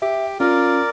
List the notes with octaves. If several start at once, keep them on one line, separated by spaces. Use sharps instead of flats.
G4 E5
C#4 F4 A#4 D5